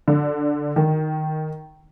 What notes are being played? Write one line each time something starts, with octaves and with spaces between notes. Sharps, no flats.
D3
D#3